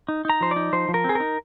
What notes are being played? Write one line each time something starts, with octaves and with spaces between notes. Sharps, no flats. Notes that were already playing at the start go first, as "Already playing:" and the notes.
D#4
D#4 A#5
F3 C5
D#4 D5
F3 C5
F3
A#4
C4 G#4
D#4 A#4